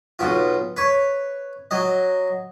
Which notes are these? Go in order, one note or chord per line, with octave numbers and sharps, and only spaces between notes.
B1 B2 F4
B4 C#5
F#3 D#5